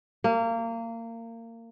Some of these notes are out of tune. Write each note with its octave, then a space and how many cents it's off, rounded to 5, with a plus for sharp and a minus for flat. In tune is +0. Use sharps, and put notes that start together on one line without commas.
A#3 -25